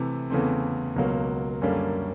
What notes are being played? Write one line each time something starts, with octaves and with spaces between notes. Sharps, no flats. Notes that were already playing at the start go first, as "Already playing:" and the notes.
Already playing: C3 E3 A3
E2 C#3 E3 A3 C4
C#2 B2 F#3 A#3
F#2 D3 G3 A#3 C#4